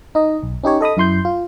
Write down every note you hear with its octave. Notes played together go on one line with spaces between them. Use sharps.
D#4 D#5
B1
C#4 D#4 G4 C#5
A4 D#5 B5 D#6
F#2 E4 C6 G6
F4